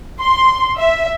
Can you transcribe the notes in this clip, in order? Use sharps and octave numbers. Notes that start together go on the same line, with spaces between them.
C6
E5